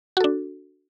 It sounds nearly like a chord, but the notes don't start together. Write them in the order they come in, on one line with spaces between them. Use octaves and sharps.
F#4 A4 D4